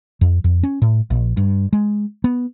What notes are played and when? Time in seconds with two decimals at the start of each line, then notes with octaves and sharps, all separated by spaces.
0.21 F2
0.44 F2
0.63 C#4
0.82 A2
1.10 A#1
1.37 G2
1.73 G#3
2.24 B3